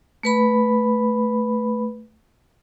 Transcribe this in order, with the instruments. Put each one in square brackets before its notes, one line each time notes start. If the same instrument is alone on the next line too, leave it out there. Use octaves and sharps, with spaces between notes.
[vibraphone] A3 B4 B5